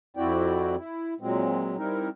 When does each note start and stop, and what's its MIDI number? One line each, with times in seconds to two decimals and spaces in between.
0.17 0.76 41
0.17 0.76 60
0.17 0.76 64
0.17 0.76 66
0.17 0.76 74
0.17 0.76 79
0.77 1.14 64
1.20 1.77 46
1.20 1.77 54
1.20 1.77 56
1.20 1.77 60
1.77 2.09 55
1.77 2.09 60
1.77 2.09 63
1.77 2.09 64
1.77 2.09 70